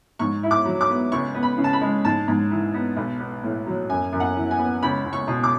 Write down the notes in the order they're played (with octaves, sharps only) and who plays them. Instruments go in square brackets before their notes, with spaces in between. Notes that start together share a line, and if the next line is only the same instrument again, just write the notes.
[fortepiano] G#2 C#6
E4
D6
F#3
D6
B3
C#2 C#6
B3
B5
C#3
A5
B5
G#3
G#2 A5
G#2
E3
B3
B1
B3
A2
F#3
F#2 G#5
F#2
F#5
E3
G#5
B3
C#2 B5
C#2
C#6
B2
D6